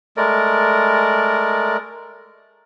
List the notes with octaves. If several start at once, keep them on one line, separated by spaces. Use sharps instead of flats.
G#3 A3 A#4 D5